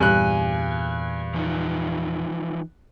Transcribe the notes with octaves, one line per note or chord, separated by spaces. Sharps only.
E2 G2 A#2 G#5 F#6
E3 F3 D#4